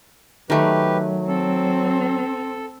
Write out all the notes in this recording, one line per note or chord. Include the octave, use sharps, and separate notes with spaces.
D#3 F#3 A3 G4 B4
C4 A4